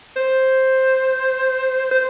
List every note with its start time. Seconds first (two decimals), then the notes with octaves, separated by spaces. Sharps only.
0.16 C5
1.91 C5